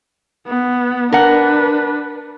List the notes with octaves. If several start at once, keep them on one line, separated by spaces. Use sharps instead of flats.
B3
D4 A#4 B4 F#5